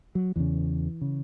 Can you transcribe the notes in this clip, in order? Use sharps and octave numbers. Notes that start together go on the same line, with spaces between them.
F#3
E2 C#3 E3
C#3